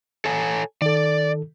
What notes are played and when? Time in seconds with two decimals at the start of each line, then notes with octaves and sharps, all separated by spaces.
0.25 A4 C#5 G#5
0.82 D#3 A4 D5